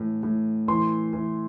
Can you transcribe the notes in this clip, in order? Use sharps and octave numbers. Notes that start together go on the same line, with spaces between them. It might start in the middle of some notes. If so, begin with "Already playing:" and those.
Already playing: A2 E3
A2
E3 C6
E3